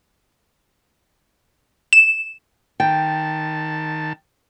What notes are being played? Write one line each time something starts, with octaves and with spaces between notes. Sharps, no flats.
E7
D#3 G5 A5